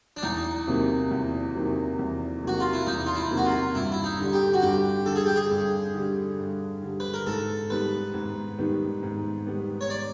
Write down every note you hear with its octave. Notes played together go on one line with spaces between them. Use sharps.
D4
E2 D#4
C3 D#3 F#3 A#3
E2
C3 D#3 F#3 A#3
E2
C3 D#3 F#3 A#3 F#4
F4
E4
E2 D#4
F4
E4
C3 D#3 F#3 A#3
F#4
F4
G2 E4
E4
D#4
D3 G3
G4
F#4
G2 G4
D3 G3 A4
G#4
G4
G#4
G2
D3 G3
G2
D3 G3
B4
A#4
G#2 A4
D#3 G3 B3 B4
G#2
D#3 G3 B3
G#2
D#3 G3 B3
C#5
D5